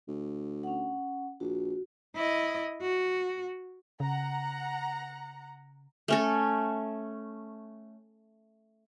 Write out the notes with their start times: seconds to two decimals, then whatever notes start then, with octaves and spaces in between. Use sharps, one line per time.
0.08 D2
0.63 C#4 F#5
1.40 A#1 F#4
2.15 E4 D#5
2.82 F#4
4.00 C#3 F#5 A#5
6.08 A3 C#4 A4